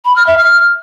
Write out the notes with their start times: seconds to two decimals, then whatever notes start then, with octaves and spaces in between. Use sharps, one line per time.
0.05 B5
0.16 F6
0.27 E5
0.38 F6